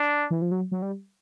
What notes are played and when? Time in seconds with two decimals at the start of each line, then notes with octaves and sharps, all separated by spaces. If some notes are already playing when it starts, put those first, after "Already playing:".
Already playing: D4
0.30 E3
0.42 F3
0.51 F#3
0.72 F#3
0.82 G3